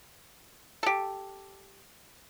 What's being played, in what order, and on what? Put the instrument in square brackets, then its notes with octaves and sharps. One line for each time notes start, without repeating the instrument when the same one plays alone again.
[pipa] G4 A4